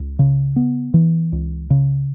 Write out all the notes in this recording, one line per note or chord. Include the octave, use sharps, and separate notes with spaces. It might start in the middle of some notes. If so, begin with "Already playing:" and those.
Already playing: C#2
C#3
B3
E3
C#2
C#3